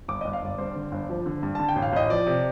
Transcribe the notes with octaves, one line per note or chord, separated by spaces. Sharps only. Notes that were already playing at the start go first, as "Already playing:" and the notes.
G1 D6
D#5
G1
F5
G1 D5
G2 C5
D3
G1
F3
D3
G2
D3 A5
G5
A1
F5
A1 D#5
F3 D5
C3